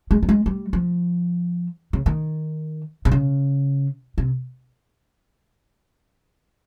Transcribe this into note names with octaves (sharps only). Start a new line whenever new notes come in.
G#3
G3
G#3
G3
F3
C#3
D#3
C3
C#3
C3